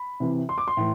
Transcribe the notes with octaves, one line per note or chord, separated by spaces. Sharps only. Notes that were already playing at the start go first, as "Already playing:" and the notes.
Already playing: B5
C3 E3
C6
D6
C6
A2 E3